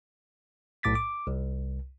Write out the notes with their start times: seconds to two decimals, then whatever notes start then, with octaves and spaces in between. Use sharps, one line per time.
0.83 B1 A2 D6 A6 B6
0.95 D6
1.27 C2